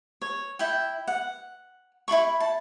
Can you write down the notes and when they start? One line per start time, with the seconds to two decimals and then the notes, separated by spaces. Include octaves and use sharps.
0.21 C#5
0.59 E4 E5 G5
1.08 F#5
2.08 E4 F4 B5 C#6
2.40 A5